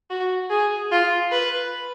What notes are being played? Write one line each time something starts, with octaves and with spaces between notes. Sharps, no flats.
F#4
G#4
F4
B4